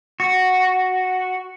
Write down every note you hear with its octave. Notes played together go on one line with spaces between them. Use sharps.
F#4